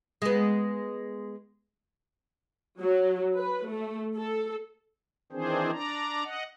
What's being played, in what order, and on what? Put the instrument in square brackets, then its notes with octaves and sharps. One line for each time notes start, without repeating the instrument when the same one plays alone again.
[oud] G#3 B3
[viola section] F#3
B4
A3
A4
[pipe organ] D#3 E3 C4 D4 G#4 C5
D4 D5 A#5
D#5 F#5